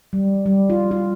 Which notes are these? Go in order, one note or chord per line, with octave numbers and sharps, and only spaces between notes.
G3
G3
F4
F4